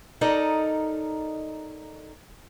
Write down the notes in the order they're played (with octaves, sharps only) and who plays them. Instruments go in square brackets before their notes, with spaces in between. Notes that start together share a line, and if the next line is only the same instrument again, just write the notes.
[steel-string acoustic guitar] D#4 A4 A#4 D5 D#5